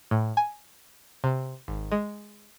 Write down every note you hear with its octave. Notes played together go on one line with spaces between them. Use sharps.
A2
G#5
C3
G#1
G#3